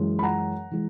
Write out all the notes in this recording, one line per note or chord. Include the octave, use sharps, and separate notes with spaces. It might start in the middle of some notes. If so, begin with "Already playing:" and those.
Already playing: F#2 E3 G#3
B5
F#5 A#5
E3 G#3